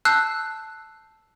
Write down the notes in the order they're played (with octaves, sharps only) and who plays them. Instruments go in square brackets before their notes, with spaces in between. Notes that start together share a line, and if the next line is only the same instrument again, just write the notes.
[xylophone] A5 E6 F#6 G6 C7